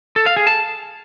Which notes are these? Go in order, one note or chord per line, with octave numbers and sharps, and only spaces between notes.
A4
F5
G#4
A5